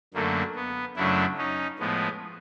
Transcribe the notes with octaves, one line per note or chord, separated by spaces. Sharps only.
F#2 D3 F#3 A3 A#3
B3
F#2 C#3 F#3 A3 D4 E4
C#4 D#4
A2 F3 G#3 B3